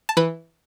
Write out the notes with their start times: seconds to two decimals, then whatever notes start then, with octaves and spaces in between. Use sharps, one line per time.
0.09 A5
0.17 E3 B4 B5